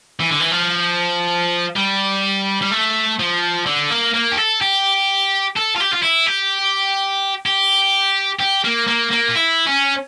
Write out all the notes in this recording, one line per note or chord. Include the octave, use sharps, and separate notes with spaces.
E3
D3
E3
F3
G3
G3
A3
F3
D3
A#3
A#3
G4
A4
G4
A4
F4
G4
F4
E4
G4
G4
G4
A#3
A#3
A#3
F4
E4
C#4